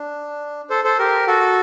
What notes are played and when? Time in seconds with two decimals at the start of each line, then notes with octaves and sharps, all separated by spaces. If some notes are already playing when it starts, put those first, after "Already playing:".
Already playing: D4
0.70 A4 C5
0.84 A4 C5
0.98 G4 A#4
1.27 F#4 A4